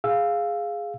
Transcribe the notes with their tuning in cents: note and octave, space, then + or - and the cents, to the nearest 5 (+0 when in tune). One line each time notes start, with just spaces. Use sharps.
G#4 +0 F5 +0 E6 +0